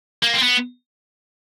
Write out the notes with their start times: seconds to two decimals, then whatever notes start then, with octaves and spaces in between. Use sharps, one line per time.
0.23 A#3
0.34 C4
0.43 B3